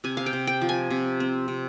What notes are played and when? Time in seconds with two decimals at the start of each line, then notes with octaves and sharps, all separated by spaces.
0.04 C3 G#5
0.17 F5
0.26 G5
0.33 C3
0.47 G5
0.61 F3
0.69 G#5
0.90 C3
1.20 C4
1.48 C3